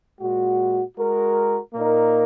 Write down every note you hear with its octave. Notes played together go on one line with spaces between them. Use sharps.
A#2 G#3 F#4
G#3 F#4 A#4
A#2 A#3 D#4 A#4